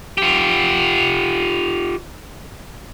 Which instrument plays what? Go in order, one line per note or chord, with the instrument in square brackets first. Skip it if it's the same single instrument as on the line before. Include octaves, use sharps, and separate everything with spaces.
[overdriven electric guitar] F4 G4